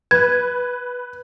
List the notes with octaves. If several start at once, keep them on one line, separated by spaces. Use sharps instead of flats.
B4 G#6